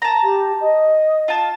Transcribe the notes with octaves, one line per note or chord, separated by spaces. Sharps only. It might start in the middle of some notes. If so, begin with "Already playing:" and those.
A5 A#5
G4
D#5
F4 A5